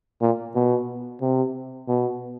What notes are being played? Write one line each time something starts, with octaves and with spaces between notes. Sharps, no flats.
A#2
B2
C3
B2